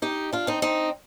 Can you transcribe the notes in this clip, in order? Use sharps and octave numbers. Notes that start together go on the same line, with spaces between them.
D#4 G4
D4 F4
C4 D#4
C4 D#4